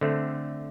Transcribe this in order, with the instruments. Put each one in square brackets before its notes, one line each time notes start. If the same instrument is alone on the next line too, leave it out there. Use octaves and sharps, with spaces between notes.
[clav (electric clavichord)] D3 A3 C4